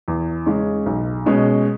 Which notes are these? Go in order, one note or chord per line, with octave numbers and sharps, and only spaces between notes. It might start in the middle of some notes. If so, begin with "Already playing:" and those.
E2
C#3 G#3 C#4
B1
B2 G#3 C#4